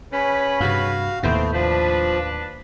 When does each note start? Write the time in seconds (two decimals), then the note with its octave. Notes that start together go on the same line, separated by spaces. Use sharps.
0.13 C#3 C#4 B4 B5
0.60 G2 C3 F#4 F5
1.23 D#2 A2 C3 A3 B3 C4
1.53 F3 D4 B4